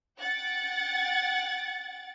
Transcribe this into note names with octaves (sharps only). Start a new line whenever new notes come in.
F#5 G5 A6